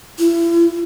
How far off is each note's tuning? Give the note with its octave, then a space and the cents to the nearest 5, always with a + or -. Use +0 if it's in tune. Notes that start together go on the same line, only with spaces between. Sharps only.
E4 +35